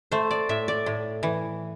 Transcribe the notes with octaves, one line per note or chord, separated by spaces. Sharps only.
A3 C5
D5
A2 E5
D5
A2
E3